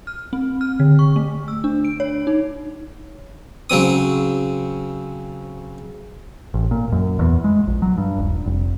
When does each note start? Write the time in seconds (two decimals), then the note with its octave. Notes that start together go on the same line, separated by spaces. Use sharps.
0.07 F6
0.33 C4
0.61 F6
0.80 D3
0.99 C#6
1.16 A3
1.48 E6
1.64 D4
1.85 D7
2.00 C#5
2.27 D#4
3.70 C#3 F#3 C4 D#6
6.54 A1
6.71 A#2
6.92 F#2
7.19 E2
7.44 G#3
7.67 A#1
7.82 F#3
7.98 G2
8.18 D#1
8.46 F1